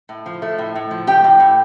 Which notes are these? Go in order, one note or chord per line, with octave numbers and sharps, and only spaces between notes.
A2
F3
A3
A2
A2
F3
A3 G4 G5
A2
A2